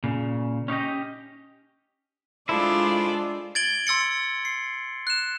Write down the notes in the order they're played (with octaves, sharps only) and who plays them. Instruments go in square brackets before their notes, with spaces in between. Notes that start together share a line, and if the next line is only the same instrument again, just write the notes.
[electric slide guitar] A#2 C#3
C#4 D#4 G4 D#5
[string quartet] G#3 F4 [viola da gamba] D4 G#4 D5 [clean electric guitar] E4 [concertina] A4 C5
[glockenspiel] G#6 A6 D7 F#7 G7
C6 E6 A6 C#7
C7
F#6 E7